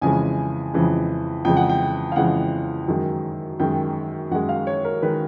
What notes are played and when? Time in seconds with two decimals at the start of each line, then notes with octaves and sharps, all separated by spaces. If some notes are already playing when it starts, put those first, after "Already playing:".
0.01 F2 C#3 E3 G#3 G#5
0.73 F2 C#3 E3 G#3
1.45 F2 C#3 E3 G#3 G5
1.57 F#5
1.69 G5
2.12 F5
2.16 F2 C#3 E3 G#3 F#5
2.88 F#2 D#3 G#3
3.60 F#2 D#3 G#3 G5
4.31 F#2 D#3 G#3 F#5
4.49 F5
4.67 C#5
4.85 A#4
5.02 D#3 G#3 B4